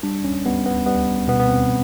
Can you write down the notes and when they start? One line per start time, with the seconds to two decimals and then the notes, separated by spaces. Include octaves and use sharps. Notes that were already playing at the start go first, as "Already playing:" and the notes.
0.03 G3 D4
0.24 C#4
0.46 G3 B3
0.66 B3
0.86 G3 B3
1.28 B2 B3
1.40 B3
1.49 C4